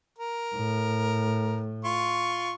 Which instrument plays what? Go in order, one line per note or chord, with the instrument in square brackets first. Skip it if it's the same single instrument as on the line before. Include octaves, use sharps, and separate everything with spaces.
[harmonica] A#4
[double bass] A2
[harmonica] F4 C6 C#6